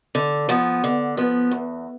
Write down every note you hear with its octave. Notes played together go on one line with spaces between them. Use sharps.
D3
F3 B3
D3
F3 B3
E2